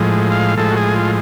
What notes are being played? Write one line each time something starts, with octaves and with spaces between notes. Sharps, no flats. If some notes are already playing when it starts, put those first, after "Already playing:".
Already playing: A2 F3 G#3
F5
A2 F3 G#3 A4
F#4
G#4
F4